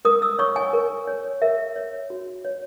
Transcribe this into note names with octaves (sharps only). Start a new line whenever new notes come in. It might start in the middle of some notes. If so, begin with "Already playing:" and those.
A#4 D#6
E6
C#5 C#6
G#5
A#4
C#5
A#4 E5
C#5
F#4
C#5